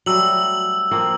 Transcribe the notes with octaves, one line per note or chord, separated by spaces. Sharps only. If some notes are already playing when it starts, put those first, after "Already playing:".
F#3 G3 A3 E6 F#7
F3 A#3 C4